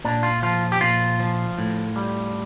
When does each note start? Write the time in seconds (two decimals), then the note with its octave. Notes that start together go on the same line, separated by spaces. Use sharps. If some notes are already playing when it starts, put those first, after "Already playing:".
0.05 A#2 D4
0.23 F4
0.43 F3 F4
0.72 G4
0.81 A#2 F4
1.20 F3
1.58 A2
1.96 G3